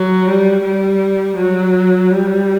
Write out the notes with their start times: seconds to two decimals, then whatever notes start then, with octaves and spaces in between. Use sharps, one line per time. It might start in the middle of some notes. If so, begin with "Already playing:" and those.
Already playing: F#3
0.27 G3
0.64 G3
1.37 F#3
2.10 G3